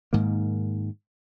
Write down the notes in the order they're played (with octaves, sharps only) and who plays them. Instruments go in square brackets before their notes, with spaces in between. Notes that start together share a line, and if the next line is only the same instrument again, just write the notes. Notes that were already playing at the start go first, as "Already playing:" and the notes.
[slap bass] G#2 D#3 A#3